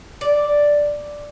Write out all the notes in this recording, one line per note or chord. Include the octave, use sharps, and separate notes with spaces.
D5